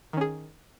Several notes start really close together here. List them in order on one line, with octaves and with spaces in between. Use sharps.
D#3 C#4 G#4